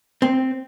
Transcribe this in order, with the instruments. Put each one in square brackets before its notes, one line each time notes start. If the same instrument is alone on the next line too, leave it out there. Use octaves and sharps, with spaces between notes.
[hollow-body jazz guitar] C4